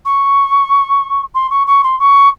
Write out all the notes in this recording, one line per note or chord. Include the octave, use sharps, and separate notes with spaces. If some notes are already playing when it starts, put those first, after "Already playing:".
C#6
C6
C#6
C#6
C6
C#6